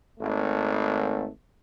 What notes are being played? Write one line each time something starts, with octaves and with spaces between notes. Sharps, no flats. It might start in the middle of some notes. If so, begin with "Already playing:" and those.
G#1 A3